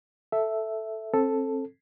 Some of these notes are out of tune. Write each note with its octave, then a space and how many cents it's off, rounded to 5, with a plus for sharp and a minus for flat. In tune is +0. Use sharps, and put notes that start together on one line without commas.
A4 +0 E5 +0
C4 +30 A4 +0